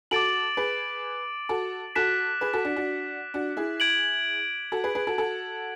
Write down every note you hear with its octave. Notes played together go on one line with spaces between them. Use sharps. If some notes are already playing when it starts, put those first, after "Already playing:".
F#4 A4 D6 A6 D7 F#7
G#4 B4
F#4 A4
F#4 A4 F#6 B6 E7
G#4 B4
F#4 A4
D4 F#4
D4 F#4
D4 F#4
E4 G#4
G#6 D7 F#7
F#4 A4
G#4 B4
G#4 B4
F#4 A4
F#4 A4